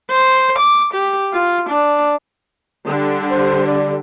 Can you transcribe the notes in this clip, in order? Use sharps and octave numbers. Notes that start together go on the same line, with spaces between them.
C5
D6
G4
F4
D4
D3 G3 G4
C5
D5